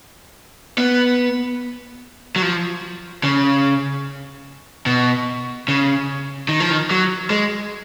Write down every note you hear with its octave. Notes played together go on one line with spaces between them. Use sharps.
B3
F#3
F3
C#3
B2
C#3
D#3
F3
D#3
F#3
G#3